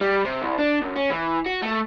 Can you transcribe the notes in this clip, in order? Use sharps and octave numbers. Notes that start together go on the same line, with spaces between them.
G3
C3
C2
D4
F#2
C#4
E3
F#4
A3